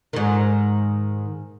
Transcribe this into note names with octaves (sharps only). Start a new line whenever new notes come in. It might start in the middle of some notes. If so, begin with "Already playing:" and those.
G#2 D#3